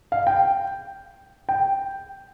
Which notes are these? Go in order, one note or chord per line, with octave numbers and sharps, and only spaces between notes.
F5
G5
G5